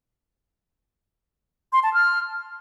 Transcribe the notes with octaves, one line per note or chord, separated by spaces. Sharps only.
C6
A5
F6